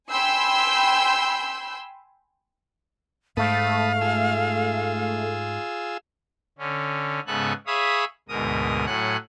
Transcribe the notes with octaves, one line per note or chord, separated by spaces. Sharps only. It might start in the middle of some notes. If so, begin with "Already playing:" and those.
G5 G#5 B5 C6 E6 G6
G#2 A3 F5 A5 B5 D#6
F4 G#4 E6
D3 C#4
G#2 C#3 B3 A4 G#5 F#6
G#4 C#5 E5 F5 B5 D#6
D2 G#2 B2 A#4 D#6
A2 F#3 F#5 G#5 F#6